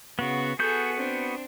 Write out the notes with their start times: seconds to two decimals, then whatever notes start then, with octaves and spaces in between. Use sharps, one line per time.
0.19 C#3 B3 F#4
0.59 B3 F#4 G#4 A4 G6
0.96 C4 D4